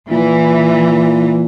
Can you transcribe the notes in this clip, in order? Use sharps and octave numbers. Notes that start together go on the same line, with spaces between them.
A#2 E3